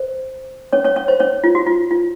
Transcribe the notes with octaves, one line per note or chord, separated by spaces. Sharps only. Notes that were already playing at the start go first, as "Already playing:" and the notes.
Already playing: C5
C#4 C#5
C#4 C#5
C#4 C#5
C5
C#4 C#5
F4
F#4
F4
F4